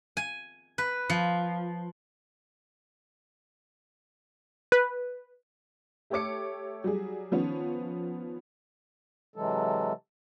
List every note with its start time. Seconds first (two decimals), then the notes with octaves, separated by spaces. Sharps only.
0.17 G#5
0.78 B4
1.10 F3
4.72 B4
6.10 A3 G4 A4 C#5 D6 C#7
6.84 F#3 G3 G#4
7.31 D#3 F3 B3 C#4
9.36 C3 E3 F#3 G#3 A4